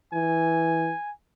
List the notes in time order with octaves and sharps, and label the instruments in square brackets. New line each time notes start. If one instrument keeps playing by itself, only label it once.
[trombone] E3 [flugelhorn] G#5